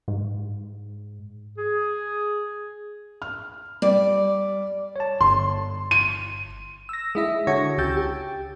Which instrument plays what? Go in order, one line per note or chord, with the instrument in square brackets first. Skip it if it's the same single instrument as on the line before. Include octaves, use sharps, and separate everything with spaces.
[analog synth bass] G#2
[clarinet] G#4
[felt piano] F6
[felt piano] G3 [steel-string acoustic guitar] D5
[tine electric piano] C#5 A5
[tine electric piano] G1 [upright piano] C6
[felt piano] D#7
[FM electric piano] E6 A#6
G#3 E4 E5
D3 F#4 C#5 C#6 G#6 A#6
C#2 C#3 G4 E6 G6 A6
G4